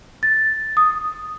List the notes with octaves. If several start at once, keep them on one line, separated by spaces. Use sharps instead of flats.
A6
D#6